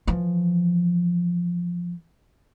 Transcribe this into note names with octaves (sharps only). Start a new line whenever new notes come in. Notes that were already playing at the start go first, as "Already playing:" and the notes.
E3 F3